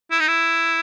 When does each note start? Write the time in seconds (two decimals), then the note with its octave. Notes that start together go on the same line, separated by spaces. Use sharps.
0.11 E4
0.20 D#4
0.28 E4